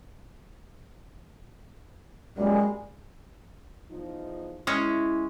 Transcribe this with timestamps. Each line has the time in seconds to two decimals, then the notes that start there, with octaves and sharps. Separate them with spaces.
2.37 F#2 A#2 G3 G#3
3.91 E2 F3 D#4
4.67 G#3 C#4 E4